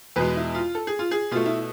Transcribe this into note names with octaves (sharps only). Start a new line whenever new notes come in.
E2 B2 G#3 B4
E4
F4
A4
G#4
F4
G#4
B2 A3 F4
E4